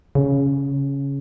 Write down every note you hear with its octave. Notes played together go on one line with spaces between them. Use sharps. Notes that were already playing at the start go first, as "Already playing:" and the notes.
C#3